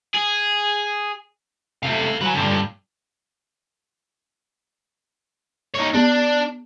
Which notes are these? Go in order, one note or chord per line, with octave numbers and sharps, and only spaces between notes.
G#4
C3 A3 A4 F5
F#3 B4 G#5
G2 A#2 D3
D#4 C#5
B3 D4